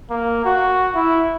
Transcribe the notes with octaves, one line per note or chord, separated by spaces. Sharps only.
A#3
F#4
E4